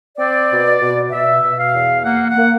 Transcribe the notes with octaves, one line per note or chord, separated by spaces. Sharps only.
C4 D5
B2
B2
B2 E5
B2
F5
E2
A#3 F#5
F#5
A#3